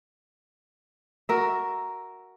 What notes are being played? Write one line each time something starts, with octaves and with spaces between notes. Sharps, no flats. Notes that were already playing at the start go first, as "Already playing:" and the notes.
F#4 A#4 E5